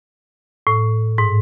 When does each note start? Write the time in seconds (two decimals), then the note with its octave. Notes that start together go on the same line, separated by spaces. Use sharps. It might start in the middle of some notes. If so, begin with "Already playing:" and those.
0.67 A2
1.18 G#2